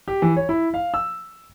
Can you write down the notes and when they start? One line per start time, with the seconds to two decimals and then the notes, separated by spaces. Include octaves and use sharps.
0.08 G4
0.22 E3
0.36 C#5
0.49 E4
0.74 F5
0.94 E6